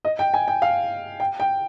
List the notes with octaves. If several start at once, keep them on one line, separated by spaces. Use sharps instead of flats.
D#5
G5
G#5
G5
F5
G5
G5